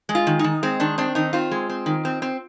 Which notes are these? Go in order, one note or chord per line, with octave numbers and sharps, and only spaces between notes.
G#3
F4
D#3
D#3 D#4
G#3 C4
D#3 D4
C4 D4
D#3 D#4
C4 F4
G#3
C4
D#3
C4
C4